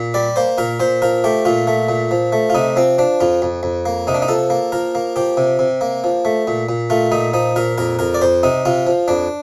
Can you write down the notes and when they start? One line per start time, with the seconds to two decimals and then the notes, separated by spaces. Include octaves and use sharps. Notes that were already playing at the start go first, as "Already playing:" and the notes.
Already playing: A#2
0.14 G3 D5
0.36 A#3 C5
0.58 A#2 A#4
0.80 A#2 C5
1.02 F3 A#4
1.24 A3 G4
1.45 A#2 F4
1.67 A3
1.89 A#2
2.11 F3
2.33 A3
2.50 F4
2.55 C3 D#4
2.76 F3 C4
2.98 F3 D4
3.20 F2 F4
3.42 F2
3.63 F2
3.86 A#3
4.07 C3 D#4
4.14 D4
4.22 D#4
4.28 F3 A4
4.50 A#3
4.72 F3 A#4
4.95 A#3
5.16 F3 G4
5.37 C3
5.59 C3
5.81 A#3
6.04 F3
6.25 A3
6.47 A#2
6.69 A#2
6.90 A3 F4
7.12 A#2 D#4
7.33 F3 D#4
7.56 A#2 A#4
7.78 F2 A#4
7.99 F2 A#4
8.14 D5
8.22 F2 C5
8.43 C3 D#4
8.65 C3 F4
8.87 F3
9.08 F2 D4